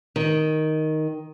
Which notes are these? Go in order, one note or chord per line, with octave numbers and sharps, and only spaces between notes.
D#3